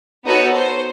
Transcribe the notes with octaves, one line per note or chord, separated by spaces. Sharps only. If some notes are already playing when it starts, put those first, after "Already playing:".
B3 D#4 F#4 A4 C#5
C5